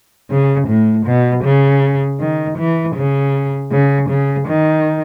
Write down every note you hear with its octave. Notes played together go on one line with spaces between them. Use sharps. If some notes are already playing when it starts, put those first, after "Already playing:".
C#3
A2
B2
C#3
D#3
E3
C#3
C#3
C#3
D#3